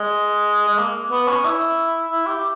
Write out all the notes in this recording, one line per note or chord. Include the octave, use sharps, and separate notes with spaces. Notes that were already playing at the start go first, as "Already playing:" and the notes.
Already playing: G#3
G#3
A#3
B3
C#4
E4
E4
G4